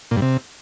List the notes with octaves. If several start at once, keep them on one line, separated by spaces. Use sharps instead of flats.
A#2
G2
C3